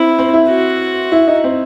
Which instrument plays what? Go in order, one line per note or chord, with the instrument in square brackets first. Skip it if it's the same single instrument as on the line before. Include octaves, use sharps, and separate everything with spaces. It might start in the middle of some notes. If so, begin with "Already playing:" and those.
Already playing: [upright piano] C4 [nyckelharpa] E4
[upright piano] C4
E4
[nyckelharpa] F#4
[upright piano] E4
D#4
C4